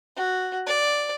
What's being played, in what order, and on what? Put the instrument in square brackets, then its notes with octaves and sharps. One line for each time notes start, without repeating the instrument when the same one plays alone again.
[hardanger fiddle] F#4
D5